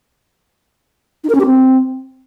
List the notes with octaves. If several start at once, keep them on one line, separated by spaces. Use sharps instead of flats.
D#4
A#4
C#4
G4
C4